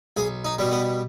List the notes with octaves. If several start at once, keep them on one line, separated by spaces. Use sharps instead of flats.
B1 G#4
D#4
B2 G3
B3